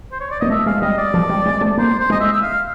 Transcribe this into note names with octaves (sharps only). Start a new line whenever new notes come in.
C5
C#5
D5
A#3 D#5
A3 E5
G#3 F5
G3 D#5
D5
F3
G3
G#3
A3
A#3 C5
C5
G#3 D#5
E5
E5
F5